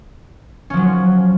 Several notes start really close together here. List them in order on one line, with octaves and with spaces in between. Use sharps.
C#4 F3 F#3